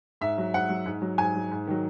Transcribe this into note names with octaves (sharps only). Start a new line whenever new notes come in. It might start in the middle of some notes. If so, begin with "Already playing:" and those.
G#2 E5
F#3
G#2 F#5
F#3
G#2
F#3
G#2 G#5
F#3
G#2
D#3 F#3